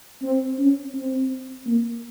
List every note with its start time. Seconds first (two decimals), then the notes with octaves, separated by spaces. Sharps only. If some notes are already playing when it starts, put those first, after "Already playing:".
0.23 C4
0.59 C#4
0.95 C4
1.66 A#3